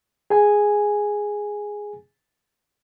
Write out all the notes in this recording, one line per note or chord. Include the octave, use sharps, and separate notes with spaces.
G#4 G#5